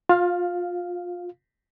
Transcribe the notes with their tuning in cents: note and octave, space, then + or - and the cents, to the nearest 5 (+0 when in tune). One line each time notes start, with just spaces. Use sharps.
F4 +25 F5 +0